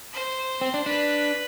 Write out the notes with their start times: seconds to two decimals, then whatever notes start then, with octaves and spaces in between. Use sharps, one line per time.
0.13 C5
0.61 C4
0.74 D4
0.86 D4 B4